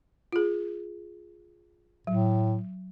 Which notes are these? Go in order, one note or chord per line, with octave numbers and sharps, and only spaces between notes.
F4 G#4
A2 F#3